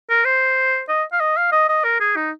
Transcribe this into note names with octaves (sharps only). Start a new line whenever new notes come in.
A#4
C5
D#5
F5
D#5
F5
D#5
D#5
A#4
G#4
D#4